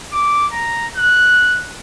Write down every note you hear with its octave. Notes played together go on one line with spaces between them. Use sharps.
D6
A#5
F#6